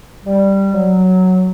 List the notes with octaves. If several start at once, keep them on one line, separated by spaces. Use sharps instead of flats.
G3
F#3